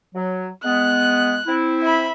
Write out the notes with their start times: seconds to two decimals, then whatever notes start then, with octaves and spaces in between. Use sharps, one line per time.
0.14 F#3
0.64 G#3 B3 F#6
1.47 C4 E4
1.82 E5 B5